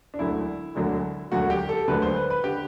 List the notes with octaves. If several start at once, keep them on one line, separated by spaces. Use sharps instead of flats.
D4
E1 D2 D3 F#3 A3 E4
E1 D2 D3 F#3 A3
E1 D2 D3 F#3 A3 F#4
G4
A4
E1 D2 D3 F#3 A3 B4
C5
B4
B4
D3 G4